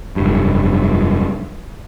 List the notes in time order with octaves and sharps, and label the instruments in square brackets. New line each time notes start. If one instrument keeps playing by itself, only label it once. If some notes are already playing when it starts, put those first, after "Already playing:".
[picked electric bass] F1 G2